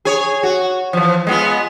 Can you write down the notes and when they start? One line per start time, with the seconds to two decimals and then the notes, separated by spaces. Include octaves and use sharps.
0.05 G#4 C#5
0.43 F#4
0.93 E3 F3
1.27 G#3 B3 F4